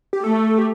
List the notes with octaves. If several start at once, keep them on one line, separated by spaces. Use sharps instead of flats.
G4
A3 A4
G4